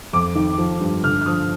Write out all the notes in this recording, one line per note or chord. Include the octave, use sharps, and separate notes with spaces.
F2 D6
D#3
F3
G2
D3 F6
F6
F3 D#6